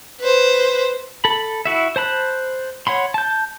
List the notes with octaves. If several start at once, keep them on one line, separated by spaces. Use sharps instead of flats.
B4 C5
A4 B5
E4 F#4 E5
C5 A5 B5 F#6
C#5 F#5 B5 C6
A5 G6